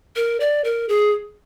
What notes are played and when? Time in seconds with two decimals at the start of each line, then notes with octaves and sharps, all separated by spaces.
0.16 A#4
0.40 D5
0.64 A#4
0.89 G#4